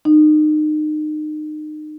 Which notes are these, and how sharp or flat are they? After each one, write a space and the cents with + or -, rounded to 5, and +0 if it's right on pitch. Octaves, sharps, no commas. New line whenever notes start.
D#4 -30